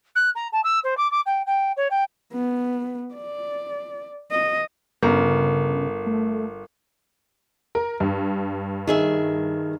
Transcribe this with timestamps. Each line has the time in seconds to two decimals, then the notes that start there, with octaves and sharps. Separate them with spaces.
0.15 F#6
0.35 A#5
0.52 A5
0.64 E6
0.84 C5
0.97 D6
1.11 D6
1.26 G5
1.47 G5
1.77 C#5
1.91 G5
2.33 B3
3.14 D5
4.31 D#5
5.03 G1 C#3 A#4
6.06 A3
7.75 A#4
8.00 G2
8.87 D#3 G#4 E5